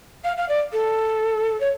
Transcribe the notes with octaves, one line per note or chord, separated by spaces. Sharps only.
F5
F5
D5
A4
C#5